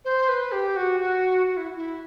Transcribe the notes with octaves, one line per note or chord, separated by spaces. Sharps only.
C5
B4
G4
F#4
F#4
F#4
E4
E4